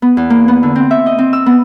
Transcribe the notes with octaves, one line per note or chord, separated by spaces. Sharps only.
B3
E2
A#3
B3
D3
C4
E5
D#5
C4
E6
B3